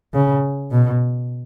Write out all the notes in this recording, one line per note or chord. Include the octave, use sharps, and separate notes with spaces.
C#3
B2